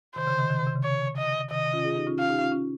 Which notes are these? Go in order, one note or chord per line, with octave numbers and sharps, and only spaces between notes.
C3 D#3 C5
C#3
C3 D#3
C3 D#3
C#3
C3
C#3
C#5
D#5
C3 D#3 D#5
C#4 F4
F4 G#4
D#4 G4
C#4 F4
C#4 F4 F5
D#4 G4
C#4 F4
C#4 F4